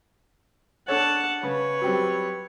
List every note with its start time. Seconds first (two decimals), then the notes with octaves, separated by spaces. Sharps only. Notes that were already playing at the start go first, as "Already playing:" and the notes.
0.88 D4 A4 C#5 F#5 A5
1.43 C#3 B4 C#5
1.82 F#3 G3 C4